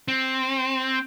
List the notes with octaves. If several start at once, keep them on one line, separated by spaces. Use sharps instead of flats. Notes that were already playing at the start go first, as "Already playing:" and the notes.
C4